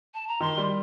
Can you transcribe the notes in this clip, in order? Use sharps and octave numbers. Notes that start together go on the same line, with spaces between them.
A5
A#5
D#3 C6
G3